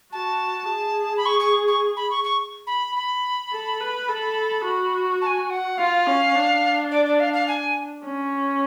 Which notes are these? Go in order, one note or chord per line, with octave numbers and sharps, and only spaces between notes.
F#4 A5
G#4
B5
C#6
C#6
C#6
B5
C#6
C#6
B5
B5
A4
B4
A4
F#4
A5
G#5
F#5
F4 F5
C#4
D4
D5
D5
F5
F5
G#5
C#4